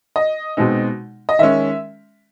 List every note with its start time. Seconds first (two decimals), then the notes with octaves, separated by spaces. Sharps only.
0.16 D#5
0.57 B2 G#3 C4 D#4
1.29 D#5
1.39 D#3 G#3 C#4 E5